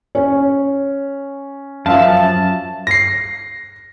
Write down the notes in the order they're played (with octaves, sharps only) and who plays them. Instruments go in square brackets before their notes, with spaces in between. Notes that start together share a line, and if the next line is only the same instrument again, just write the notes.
[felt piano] C#4
[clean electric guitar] F#2 F3 [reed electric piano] E5 F5 [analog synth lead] A5
[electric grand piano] A#6 C7